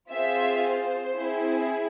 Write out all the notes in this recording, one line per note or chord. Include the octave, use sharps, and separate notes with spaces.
C4 F4 G#4 C5 E5
C5
C4 E4 G#4